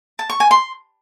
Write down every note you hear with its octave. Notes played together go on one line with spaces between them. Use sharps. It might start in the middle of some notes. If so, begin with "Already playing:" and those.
A5
C#6
G#5
C6